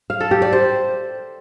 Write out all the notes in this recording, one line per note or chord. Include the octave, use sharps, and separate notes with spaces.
F5
A4
G4
D5
C5